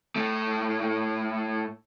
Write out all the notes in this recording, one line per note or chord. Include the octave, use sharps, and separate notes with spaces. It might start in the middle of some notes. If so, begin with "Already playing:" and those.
A2 A3